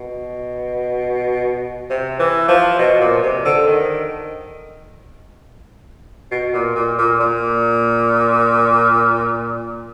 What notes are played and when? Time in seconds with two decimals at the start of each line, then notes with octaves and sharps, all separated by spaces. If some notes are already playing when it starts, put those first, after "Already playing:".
Already playing: B2
1.90 C3
2.19 E3
2.48 F3
2.79 B2
3.01 A#2
3.23 C3
3.45 D3
3.67 D#3
6.31 B2
6.54 A#2
6.75 A#2
6.99 A#2
7.20 A#2